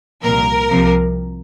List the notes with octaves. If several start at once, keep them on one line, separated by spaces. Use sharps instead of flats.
C2 A#2 F3 A#4
C2 C3 F3